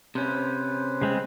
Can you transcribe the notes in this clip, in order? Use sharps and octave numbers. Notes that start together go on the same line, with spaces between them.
C3 C#4 B4 C5
C#3 G#3 C4